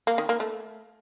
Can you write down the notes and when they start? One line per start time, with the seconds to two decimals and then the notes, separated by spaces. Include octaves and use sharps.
0.07 A#3
0.18 D#3
0.29 A#3
0.40 A3